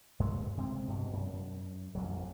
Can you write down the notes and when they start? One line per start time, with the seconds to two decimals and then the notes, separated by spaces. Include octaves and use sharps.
0.20 G2 G#3 A3
0.57 C3 G#3 C4
0.88 G2 B2
1.13 F#2
1.95 A1 F2 F#3